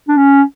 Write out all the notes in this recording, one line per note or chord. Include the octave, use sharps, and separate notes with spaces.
D4
C#4